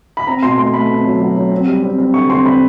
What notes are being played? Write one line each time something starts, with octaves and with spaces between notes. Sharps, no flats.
B5
C4 A#5
B2 C6
A3 C6
A3 B5
C4
F#3
F#3
F#3
C4
G3
C4
C4
D3 C#6
C4 C6
C4 B5